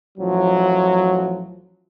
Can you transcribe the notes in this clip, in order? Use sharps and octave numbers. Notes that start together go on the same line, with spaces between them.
A1 F3 F#3